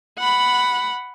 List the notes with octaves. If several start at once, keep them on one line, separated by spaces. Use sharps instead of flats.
F#5 B5